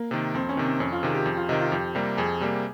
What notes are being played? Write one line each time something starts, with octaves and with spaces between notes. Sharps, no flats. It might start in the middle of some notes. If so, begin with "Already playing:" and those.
Already playing: A#3
C3 D#3
F2 C4
C#4
C3 D#3
C4
F2 C#4
F4
C3 D#3 G#4
G4
F2
F4
C3 D#3 D#4
F4
F2 G4
C3 G3 A#3
F2 G#4
C3 G3 A#3